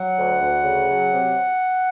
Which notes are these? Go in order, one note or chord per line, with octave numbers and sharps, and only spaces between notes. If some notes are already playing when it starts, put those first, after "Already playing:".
Already playing: F#3 F#5
D2
D2
C#3
F#3
C3